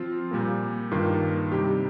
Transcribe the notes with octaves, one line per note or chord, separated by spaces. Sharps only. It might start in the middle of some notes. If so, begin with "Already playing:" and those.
Already playing: F3 C4 F4
A#2 G3 A#3
G2 D#3 A#3 F4
C3 G3 D#4 G4